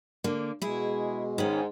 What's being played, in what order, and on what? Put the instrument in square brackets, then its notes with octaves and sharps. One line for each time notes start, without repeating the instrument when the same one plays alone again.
[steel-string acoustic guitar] D3 A#3
[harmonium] B2 G#3 [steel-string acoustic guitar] E4 G#4
[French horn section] G#2 [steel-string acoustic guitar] D#3 B3 C#4